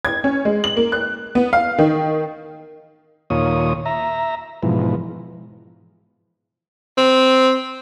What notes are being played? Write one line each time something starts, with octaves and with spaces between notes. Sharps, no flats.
G#6
C#4
G#3
F#7
A#3
F#6
B3
F5
D#3
D#2 A#2 F4 C#5 D#6
E5 A#5
G#2 B2 E3 F3
C4